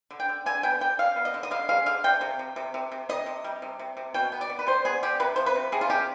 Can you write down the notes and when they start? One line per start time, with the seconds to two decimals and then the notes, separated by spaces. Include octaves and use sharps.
0.11 D3
0.20 G5
0.29 D3
0.46 D3 G#5
0.63 B3 G5
0.81 D3 G5
0.99 D3 F5
1.16 B3
1.25 D#5
1.34 D3
1.43 D#5
1.51 D3 F5
1.69 G#3 F5
1.86 D3 F5
2.04 C3 G5
2.21 C3
2.39 C3
2.56 C3
2.74 C3
2.92 C3
3.09 C3 D#5
3.26 C3
3.44 G3
3.62 C3
3.79 C3
3.97 C3
4.14 B2 G5
4.32 B3
4.41 D5
4.50 B3
4.59 B4
4.67 G3 C5
4.85 B3 G#4
5.03 G3 G4
5.20 C3 B4
5.36 F3 C5
5.46 B4
5.55 C3
5.72 C3 G#4
5.81 F4
5.90 G#3 G4